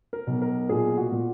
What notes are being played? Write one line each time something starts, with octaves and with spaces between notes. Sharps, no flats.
A#4
B1
A#4
A#2 G#4
F#4
A#2